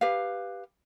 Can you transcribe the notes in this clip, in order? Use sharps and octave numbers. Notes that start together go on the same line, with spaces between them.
G4 B4 F5